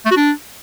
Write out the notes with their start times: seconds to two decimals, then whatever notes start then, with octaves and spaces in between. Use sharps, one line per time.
0.06 A3
0.11 F#4
0.16 D4